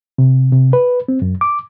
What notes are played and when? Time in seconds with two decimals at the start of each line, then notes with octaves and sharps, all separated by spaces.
0.18 C3
0.52 C3
0.73 B4
1.08 C4
1.22 F#2
1.41 D6